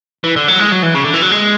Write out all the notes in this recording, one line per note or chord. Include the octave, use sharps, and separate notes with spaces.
E3
D3
F#3
G#3
F#3
E3
C#3
D3
E3
F#3
G#3